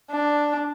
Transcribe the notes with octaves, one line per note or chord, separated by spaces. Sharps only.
D4